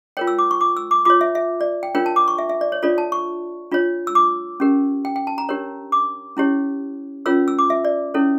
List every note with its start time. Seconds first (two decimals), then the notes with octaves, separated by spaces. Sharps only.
0.17 F4 A#4 C#5 G5
0.27 E6
0.39 D6
0.51 C#6
0.61 D6
0.77 E6
0.91 D6
1.05 F4 C#5 D6
1.21 E5
1.35 E5
1.61 D5
1.83 G5
1.95 D4 F4 A#4 C#5 G5
2.06 A5
2.16 D6
2.28 C#6
2.38 E5
2.49 E5
2.61 D5
2.72 C#5
2.82 D4 F4 A4 C#5 D5
2.98 A5
3.12 C#6
3.71 D4 F4 C#5
4.07 E6
4.15 D6
4.60 C#4 G4 A#4
5.05 G5
5.16 G5
5.27 A5
5.38 A#5
5.49 D4 G4 A#4 C#5
5.92 D6
6.37 C#4 E4 G4 C#5
7.26 C#4 F4 A#4 C#5 E6
7.48 E6
7.59 D6
7.70 E5
7.85 D5
8.14 C#4 E4 A4 C#5